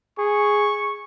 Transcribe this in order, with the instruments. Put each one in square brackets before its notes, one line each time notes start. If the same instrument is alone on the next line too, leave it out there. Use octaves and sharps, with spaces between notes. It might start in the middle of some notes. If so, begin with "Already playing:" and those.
[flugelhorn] G#4 [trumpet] C#6